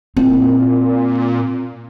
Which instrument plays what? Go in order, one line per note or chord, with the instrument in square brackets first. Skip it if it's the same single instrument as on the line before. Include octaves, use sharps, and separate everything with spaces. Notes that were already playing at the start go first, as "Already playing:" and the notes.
[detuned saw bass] A#2 [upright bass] C4 E4